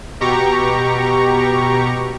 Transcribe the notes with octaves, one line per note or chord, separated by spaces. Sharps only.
B2 G4 A#5 C#6